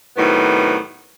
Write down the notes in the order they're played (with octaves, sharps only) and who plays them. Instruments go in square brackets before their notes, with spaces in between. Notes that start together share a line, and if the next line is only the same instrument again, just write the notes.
[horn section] A2 C3 D#3 F#3 B3